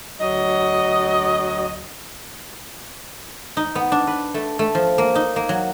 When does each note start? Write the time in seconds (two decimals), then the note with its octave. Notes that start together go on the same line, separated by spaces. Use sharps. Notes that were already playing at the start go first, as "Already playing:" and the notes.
0.20 D2 F#3 D#5
3.57 D#4
3.75 B3
3.92 D4
4.07 B4
4.34 A3
4.59 A3
4.75 F3
4.98 A#3
5.15 D#4
5.36 A#3
5.49 F#3